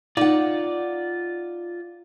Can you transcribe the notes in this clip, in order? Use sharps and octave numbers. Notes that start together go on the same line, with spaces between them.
D#4 F4 D5 F#5